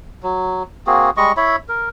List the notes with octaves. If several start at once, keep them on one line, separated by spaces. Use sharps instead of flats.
F#3
A#3 C4 F#4 G#4
G3 G#3 D#5 C#6
E4 C#5 E5 B5
A#4